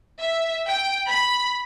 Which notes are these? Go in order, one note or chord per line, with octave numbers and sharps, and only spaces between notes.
E5
G5
B5